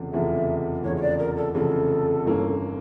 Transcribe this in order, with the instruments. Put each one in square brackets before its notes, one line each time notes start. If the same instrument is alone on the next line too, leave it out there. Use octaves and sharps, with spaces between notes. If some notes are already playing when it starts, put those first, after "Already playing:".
Already playing: [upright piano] F1 E2 C#3 F3
[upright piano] F1 E2 C#3 F3 [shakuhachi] E5
[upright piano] F1 E2 C#3 F3 [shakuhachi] C#5
[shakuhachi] C#5
D5
A#4
A4
[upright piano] F1 E2 C#3 F3 [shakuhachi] A4
[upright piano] G1 G2 E3 A#3 C#4